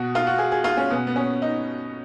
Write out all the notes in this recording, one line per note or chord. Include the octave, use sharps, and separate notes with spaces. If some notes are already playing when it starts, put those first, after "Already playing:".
Already playing: B2 F#4
F4
F#4
G#4
G#4
F4
C#4
B2 B3
B3
C#4
D#4